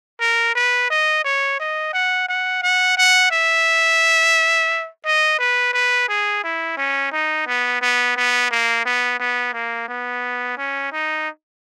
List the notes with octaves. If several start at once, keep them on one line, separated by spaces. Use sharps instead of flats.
A#4
B4
D#5
C#5
D#5
F#5
F#5
F#5
F#5
E5
D#5
B4
B4
G#4
E4
C#4
D#4
B3
B3
B3
A#3
B3
B3
A#3
B3
C#4
D#4